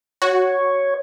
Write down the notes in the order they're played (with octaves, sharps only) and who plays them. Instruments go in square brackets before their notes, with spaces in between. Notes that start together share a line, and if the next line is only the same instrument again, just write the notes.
[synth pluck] F#4 [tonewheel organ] C#5